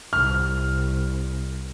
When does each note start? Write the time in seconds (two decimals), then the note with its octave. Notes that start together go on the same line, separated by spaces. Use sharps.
0.13 C2 F6